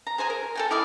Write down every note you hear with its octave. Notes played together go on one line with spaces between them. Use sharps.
A#5
G#4 C5 G#5 A#5
A#4
A4 G5 G#5
E4 D5 D#5 F5